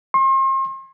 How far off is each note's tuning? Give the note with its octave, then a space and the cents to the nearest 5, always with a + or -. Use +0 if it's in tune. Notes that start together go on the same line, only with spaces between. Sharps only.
C6 +40